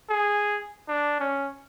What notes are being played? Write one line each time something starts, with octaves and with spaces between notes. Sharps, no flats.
G#4
D4
C#4